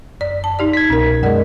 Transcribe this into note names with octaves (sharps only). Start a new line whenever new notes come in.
F#2 D5
A5
D#4 G4 D5
G#6 B6
C2 B2 C#4 A#4
F#2 G#3 A#4 D5 F#5